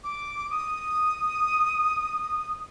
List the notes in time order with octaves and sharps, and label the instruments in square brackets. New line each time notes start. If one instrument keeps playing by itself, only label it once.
[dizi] D6
D#6